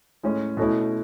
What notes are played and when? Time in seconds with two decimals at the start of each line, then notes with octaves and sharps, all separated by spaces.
0.23 A2 G#3 C#4
0.57 B2 A3 C#4 E4